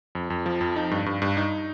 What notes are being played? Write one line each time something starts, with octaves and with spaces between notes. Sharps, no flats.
F2
F2
F3
F2
D#4
G2
G2
G2
D#4